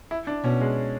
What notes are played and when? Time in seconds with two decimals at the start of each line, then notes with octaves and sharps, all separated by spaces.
0.11 E4
0.27 D4
0.44 B2 C#4
0.61 G#3